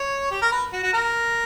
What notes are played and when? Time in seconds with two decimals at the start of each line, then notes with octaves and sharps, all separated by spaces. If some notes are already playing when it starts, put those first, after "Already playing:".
Already playing: C#5
0.31 G4
0.42 A#4
0.52 B4
0.72 F#4
0.83 F#4
0.93 A#4